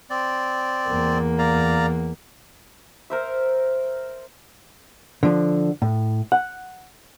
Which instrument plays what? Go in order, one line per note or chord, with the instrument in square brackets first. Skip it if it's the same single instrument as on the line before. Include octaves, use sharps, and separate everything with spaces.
[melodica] C4 D5
[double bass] E2 A#3
[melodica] D5 F5 A#5
[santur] A#4 C5 E5
[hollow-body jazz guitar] D3 F3
A2
F#5